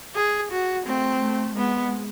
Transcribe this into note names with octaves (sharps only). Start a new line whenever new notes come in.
G#4
F#4
A3 C4
A3
G#3 B3